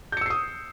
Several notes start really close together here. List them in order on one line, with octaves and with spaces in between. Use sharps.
G6 C#7 E6 C7 D#6